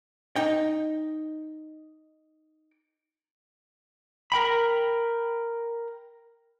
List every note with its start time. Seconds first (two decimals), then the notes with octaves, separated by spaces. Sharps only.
0.36 D#4 G5
4.32 A#4 G5 B5